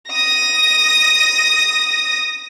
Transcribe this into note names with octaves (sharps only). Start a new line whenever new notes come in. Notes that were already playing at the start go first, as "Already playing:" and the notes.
D#6 A#6